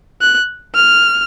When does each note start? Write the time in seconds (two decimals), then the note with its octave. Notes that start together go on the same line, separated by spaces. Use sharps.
0.21 F#6
0.75 F6